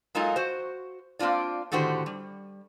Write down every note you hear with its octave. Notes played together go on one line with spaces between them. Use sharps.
F#3 G#3 A#3 D#4 F4 A4
F#4 C5
A#3 C4 D4 F4 D5
A2 D3 D#3 F#4 G4 C5
G3